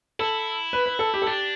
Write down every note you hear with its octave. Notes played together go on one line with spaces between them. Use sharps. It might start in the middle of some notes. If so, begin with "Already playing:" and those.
E4 A4
B4
B4
A4
G4
A4
D4 G4